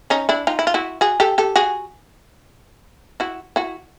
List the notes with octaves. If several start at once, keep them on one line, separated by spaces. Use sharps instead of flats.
C#4 D#4
D4 E4
D#4 F4
E4
F4
E4 F#4
F#4 G#4
G4 A4
G4 A4
F#4 G#4
E4 F#4
E4 F#4